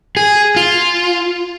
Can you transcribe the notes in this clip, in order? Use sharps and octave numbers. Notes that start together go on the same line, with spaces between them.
G#4
F4